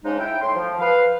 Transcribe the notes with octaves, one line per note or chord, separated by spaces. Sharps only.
G#2 C#3 F3 G#3 C#4 D#4
E4 G5
A2 C6
F3
B4 F5